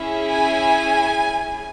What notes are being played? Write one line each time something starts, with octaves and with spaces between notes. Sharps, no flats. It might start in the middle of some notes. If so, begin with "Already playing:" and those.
Already playing: C#4 E4 G#4
G#5